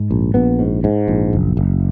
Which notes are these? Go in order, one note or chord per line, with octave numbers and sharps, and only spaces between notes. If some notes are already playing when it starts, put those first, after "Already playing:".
Already playing: G#2
A#1
A#1 B3
G#2
G#2
A#1
F#1
F#1